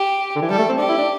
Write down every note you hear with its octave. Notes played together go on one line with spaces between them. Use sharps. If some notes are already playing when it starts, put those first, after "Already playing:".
Already playing: G4
D3
E3
G3 A4
A3
C4
D4 G4
E4
D4